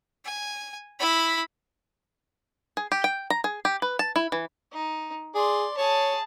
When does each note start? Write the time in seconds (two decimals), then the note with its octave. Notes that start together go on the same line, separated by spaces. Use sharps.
0.25 G#5
0.99 E4 B5
2.77 G#4
2.92 G4
3.04 G5
3.30 A#5
3.44 G#4
3.65 G4
3.82 B4
3.99 A5
4.16 E4
4.32 E3
4.73 D#4
5.35 G#4 D5 C6
5.77 G#4 C#5 A5